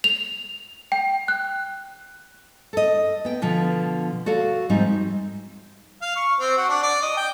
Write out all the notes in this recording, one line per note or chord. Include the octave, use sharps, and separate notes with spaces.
F7
G5
F#6
A4 D#5
B3 G5
B2 D3 F3 B3
F#4 A4 D5 F5
G#2 F3 G3 C4 D#4
F5
C#6
C4
F#4
D4
D5
D#5
G5